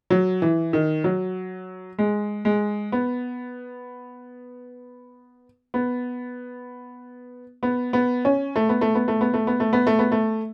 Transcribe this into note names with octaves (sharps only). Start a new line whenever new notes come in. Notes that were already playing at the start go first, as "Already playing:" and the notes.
F#3
E3
D#3
F#3
G#3
G#3
B3
B3
B3
B3
C#4
A3
B3
A3
B3
A3
B3
A3
B3
A3
B3
A3
B3
A3